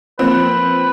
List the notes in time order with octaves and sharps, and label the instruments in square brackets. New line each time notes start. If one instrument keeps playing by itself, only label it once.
[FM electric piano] F3 A#3 F4 [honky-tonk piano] C4 [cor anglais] B4